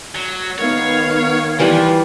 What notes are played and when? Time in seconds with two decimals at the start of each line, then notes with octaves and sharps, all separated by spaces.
0.15 F#3
0.58 D#3 B3 C#5 F5
1.59 E3 F3 G3 B4